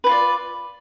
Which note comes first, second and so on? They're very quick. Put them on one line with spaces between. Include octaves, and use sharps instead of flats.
B4 E4 F4 D5